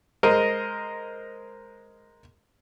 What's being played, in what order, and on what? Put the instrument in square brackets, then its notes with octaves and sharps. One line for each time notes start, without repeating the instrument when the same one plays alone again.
[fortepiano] G#3 A#4 C5 D#5